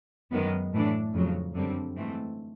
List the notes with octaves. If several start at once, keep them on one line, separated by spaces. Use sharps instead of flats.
F#2 D#3 G#3 B3
A2 E3 A3 D4
F2 C#3 F#3
F#2 D3 G3 C4
G#2 E3 A3 C4